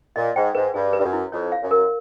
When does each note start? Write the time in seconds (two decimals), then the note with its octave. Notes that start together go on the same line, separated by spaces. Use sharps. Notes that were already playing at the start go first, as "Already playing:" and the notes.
0.16 A#2 D#5
0.36 G#2 G5
0.55 G#2 B4
0.74 G2 G#4
0.93 B4
0.99 G2
1.04 F#2
1.13 E4
1.32 F2 C#5
1.52 F5
1.62 F#2
1.71 A#4